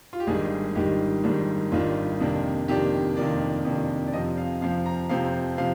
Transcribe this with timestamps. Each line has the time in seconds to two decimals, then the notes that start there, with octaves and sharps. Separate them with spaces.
0.13 F4
0.20 G4
0.27 G#1 G#2 D#3 G3 D4 G#4
0.75 G#1 G#2 D#3 G3 D4 G4
1.24 G#1 G#2 D#3 G3 D4
1.72 G#1 G#2 D#3 G3 D4 F4
2.20 F2 C3 D#3 A#3 D4
2.68 F2 C3 D#3 A#3 D4 G4
3.16 F2 C3 D#3 A#3 D4 D5
3.65 F2 C3 D#3 A#3 D4
4.07 D5
4.13 F2 C3 F3 C4 D#5
4.37 F5
4.61 F2 C3 F3 C4 F5
4.86 A#5
5.09 F2 C3 F3 C4 F5
5.58 C3 F3 C4 F5